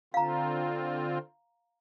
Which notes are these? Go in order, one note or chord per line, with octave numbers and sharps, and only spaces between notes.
D3 C4 F4 F5 A#5